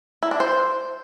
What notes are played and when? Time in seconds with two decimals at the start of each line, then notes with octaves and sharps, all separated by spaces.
0.23 E4
0.31 D4
0.40 C5